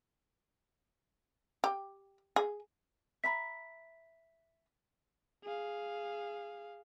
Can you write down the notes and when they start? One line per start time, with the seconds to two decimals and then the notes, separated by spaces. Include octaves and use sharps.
1.64 G4
2.36 G#4
3.24 E5 A#5 B5 B6
5.44 G#4 F5